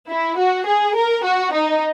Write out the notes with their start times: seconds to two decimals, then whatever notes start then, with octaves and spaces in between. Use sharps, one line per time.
0.10 E4
0.38 F#4
0.67 G#4
0.97 A#4
1.25 F#4
1.54 D#4